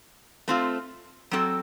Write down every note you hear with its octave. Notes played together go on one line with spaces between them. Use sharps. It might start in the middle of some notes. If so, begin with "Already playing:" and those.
A3 C4 F4
F#3 C4 F#4 A4